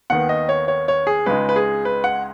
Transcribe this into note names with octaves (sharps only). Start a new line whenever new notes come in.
D#2 D#3 B3 F#5
D#5
C#5
C#5
C#5
G#4
C#2 C#3 G#3 D#4 B4
B4
G#4
B4
F#5